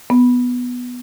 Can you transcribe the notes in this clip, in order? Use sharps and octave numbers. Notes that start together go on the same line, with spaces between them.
B3